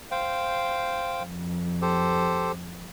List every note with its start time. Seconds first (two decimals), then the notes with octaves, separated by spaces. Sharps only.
0.11 C5 F5 G5
1.24 F2
1.82 G4 A4 C5